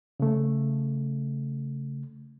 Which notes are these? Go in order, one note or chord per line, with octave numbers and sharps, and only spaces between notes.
C#3 A3